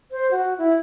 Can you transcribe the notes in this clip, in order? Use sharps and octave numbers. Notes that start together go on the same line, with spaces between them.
C5
F#4
E4